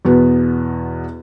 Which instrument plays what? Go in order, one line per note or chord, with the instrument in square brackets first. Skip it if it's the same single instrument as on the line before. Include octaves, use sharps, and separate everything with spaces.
[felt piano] E2 B2 B3